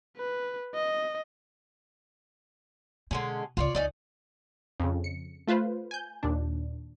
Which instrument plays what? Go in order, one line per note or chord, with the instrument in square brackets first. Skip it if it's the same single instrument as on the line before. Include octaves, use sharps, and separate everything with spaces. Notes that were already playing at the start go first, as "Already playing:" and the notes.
[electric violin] B4
D#5
[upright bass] B2 [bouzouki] D3 G#3 C#4
[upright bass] C#2 [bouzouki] F4 C#5 D5
[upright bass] C#2 [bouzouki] C#4 D#4 D5
[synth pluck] F2 C#3
C#7
A3 F4 B4 C5
G#5 G6
D#2 A#2 D4